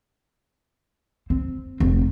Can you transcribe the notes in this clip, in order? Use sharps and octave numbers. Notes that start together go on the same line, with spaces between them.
C4
F1